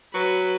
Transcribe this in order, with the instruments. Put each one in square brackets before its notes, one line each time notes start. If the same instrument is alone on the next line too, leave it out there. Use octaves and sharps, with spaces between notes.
[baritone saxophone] F#3 [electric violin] B4